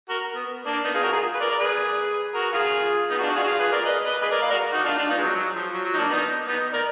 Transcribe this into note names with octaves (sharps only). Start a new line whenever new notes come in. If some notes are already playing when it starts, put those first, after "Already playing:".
F#4 A#4
B3
A#3 D4
B3 D#4
F4 G#4
F#4 A#4
F4 G#4
B4
A#4 D5
D5
G#4 B4
F#4 A#4
F4 G#4
B3 D#4
F#4
D4 F4
F#4
F4 G#4
F#4
F4 G#4
G#4 B4
A#4 D5
B4 D#5
B4 D#5
G#4 B4
A#4 D5
D5 F5
F#4 A#4
D#4 F#4
D4 F4
D4 F4
B3 D#4
G#3
F#3
F#3
F3
F#3
F#3
D#4
A#3 D4
B3 D#4
B3 D#4
A#4 D5